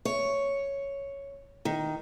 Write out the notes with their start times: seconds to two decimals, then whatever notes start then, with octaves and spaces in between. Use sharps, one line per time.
0.05 C#5
1.65 D#3